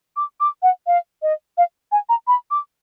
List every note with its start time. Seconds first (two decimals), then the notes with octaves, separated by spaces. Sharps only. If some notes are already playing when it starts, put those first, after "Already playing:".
0.16 D6
0.40 D6
0.63 F#5
0.87 F5
1.22 D#5
1.58 F5
1.92 G#5
2.09 A#5
2.27 B5
2.51 D6